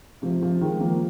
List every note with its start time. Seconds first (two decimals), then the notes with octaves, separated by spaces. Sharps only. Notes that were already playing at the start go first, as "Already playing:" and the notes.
0.22 C3 F3
0.41 C3 F3
0.61 D#3 G#3
0.80 F3 A#3